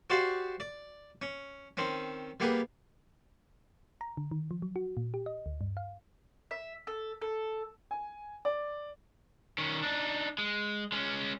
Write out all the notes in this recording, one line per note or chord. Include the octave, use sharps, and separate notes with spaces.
F#4 G4 C5 D5 F5
D5
C#4
D#3 C4 C#4
G3 A#3 B3 G4 G#4
A#5
D3
D#3
F3
F#3
F#4
A#2
G4
D#5
D2
G2
F5
E5
A4
A4
G#5
D5
D#3 C#4
D4 D#4
G#3
G#3 C#4